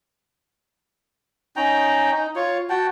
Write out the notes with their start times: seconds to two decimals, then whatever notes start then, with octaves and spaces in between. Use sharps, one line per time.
1.56 C#4 D#4 G5 A#5
2.11 D#4
2.36 F4 C#5
2.70 F#4 F#5 G5 A5